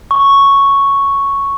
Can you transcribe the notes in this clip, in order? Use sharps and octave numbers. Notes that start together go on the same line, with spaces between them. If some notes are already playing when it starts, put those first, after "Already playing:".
C#6